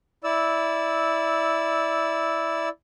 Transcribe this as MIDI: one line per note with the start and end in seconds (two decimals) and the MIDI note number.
0.24 2.69 64
0.24 2.69 74
0.24 2.69 88